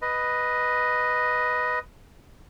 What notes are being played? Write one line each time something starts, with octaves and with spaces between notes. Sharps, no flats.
B4 D#5